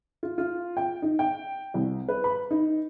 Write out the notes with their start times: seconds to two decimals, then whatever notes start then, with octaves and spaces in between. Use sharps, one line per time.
0.23 F4
0.38 F4
0.77 G5
1.02 D#4
1.19 G5
1.74 C2
2.08 B4
2.24 B5
2.51 D#4